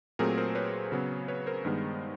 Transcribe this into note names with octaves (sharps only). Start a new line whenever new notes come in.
A#2 F#3 A3 C4 G#4 A#4
A#4 C5
B4 C#5
C#3 F#3 B3
B4 C#5
A#4 C5
G2 D#3 G#3 B3